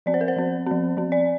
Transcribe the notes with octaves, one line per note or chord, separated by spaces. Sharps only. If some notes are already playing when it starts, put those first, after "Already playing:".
F3 C4 D5
C5
A#4
C5
F3 C4
F3 C4
F3 C4
D5